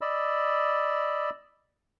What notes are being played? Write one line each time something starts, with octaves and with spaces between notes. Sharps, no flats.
D5 D#5 B5 E6